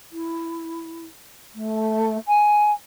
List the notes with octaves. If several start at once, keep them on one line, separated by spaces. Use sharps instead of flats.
E4
A3
G#5